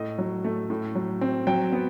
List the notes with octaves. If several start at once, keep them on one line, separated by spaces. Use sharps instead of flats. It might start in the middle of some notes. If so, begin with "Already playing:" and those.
Already playing: A2 D#5
F#3
A3
A2
F#3
C4
F#3 G5
B3